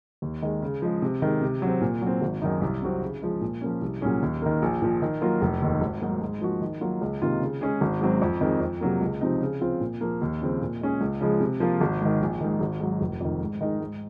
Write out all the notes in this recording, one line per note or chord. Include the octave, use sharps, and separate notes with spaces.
D#2
D#3 G#3
C#3
F3 G#3
C3
D#3 G#3
C3
F#3 C4
A#2
F#3
C4
G#1
F#2 D#3 G#3 D#4
C2
C3 F#3 C4 F#4
C#3
F3 G#3
A#2
F3 A#3 C#4
C2
A#2 F#3 C#4 G#4
D#2
D#3 A#3
A#1
A#2 F3
D#3
F#3 A#3 F4 A#4
F1
D#2 D#3
G#1
G#2 F#3 A#3
G#2
F3 A#3 D#4 F#4
D#3
F#3 A#3 F4
C#2
C3 D#3 A#3 F4
C#3
G#3 C#4 G#4
G#1
G#2 F#3 C4
F2
D#3 G#3 C4
F2
C3 F#3 A#3
C#2
C3 F3 C4 D#4
C#3
F3 C4 F4
A#2
F3 A#3
D#2
C#3 F3 C4
A#2
G#3 C#4 G#4
C#2
C#3 F3 G#3
C3
F3 A#3 F4
G#1
G#2 D#3
A#1
G#2 D#3
G#1
G#2 F#3
F1
F2 D#3
G#2
D#3 G#3 D#4
G#2